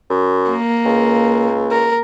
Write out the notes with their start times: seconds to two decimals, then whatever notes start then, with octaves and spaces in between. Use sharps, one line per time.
0.10 F#2
0.51 A#3
0.85 C#2
1.71 A#4